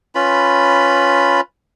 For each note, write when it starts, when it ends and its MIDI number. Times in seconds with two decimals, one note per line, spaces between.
0.15 1.41 61
0.15 1.41 65
0.15 1.41 71
0.15 1.41 83